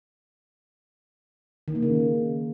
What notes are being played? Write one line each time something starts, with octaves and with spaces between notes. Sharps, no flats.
D#3
A#3
C#3